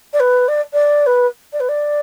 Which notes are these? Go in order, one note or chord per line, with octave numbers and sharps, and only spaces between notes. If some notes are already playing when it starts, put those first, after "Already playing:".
D5
B4
D5
D5
B4
D5
B4
D5